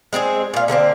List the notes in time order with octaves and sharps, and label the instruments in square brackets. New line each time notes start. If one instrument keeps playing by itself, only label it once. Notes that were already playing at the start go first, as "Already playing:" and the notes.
[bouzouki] G#3 C4 G4 G#4
A#2 F5
D3 A3 A#3 C4